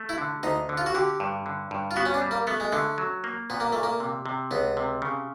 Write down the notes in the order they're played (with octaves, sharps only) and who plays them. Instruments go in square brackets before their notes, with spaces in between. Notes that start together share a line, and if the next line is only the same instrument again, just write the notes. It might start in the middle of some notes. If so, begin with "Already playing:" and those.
Already playing: [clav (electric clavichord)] A3
[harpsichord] E4
[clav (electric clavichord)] D3
[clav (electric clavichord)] D2 [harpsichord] D#4
[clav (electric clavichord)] D3
[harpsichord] F4
F#4
[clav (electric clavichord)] D3 [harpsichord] G4
[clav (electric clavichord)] G2
D3
G2
[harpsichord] F4
[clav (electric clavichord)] B3 [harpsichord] F#4
[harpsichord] C#4
D4
[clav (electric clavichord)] G3
[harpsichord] A#3
[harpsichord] A3 [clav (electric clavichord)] B3
[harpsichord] G#3
[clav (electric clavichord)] D3 [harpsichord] A3
[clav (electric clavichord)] F#3
A#3
[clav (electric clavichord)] A#2 [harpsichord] B3
[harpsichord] A#3
[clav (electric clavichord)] A#2 [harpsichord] A3
[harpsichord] A#3
[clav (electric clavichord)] C3
C3
[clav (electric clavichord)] C#2 [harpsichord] B3
[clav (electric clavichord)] C3
C#3